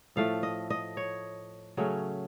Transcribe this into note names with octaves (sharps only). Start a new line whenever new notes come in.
A2 F3 A3 F5
D#5
D#5
C#5
C#3 F#3 A3 C#4